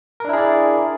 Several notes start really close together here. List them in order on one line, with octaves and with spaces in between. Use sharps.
A#4 D4 E4 G#4 D5